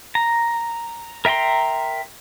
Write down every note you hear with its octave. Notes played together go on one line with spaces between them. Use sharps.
A#5
A#4 E5 G5 A#5 C6